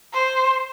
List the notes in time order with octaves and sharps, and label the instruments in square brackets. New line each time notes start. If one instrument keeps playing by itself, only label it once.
[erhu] C5